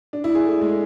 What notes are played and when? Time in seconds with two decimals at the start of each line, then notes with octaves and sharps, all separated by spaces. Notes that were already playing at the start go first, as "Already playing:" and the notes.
0.13 D4
0.24 E4
0.35 G#4
0.45 A3
0.61 G#3